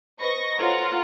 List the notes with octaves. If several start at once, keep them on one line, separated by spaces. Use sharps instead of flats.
B4 C5 D#5 B5 C#6 A#6
F4 A4 C5 C#5 F#5 A#5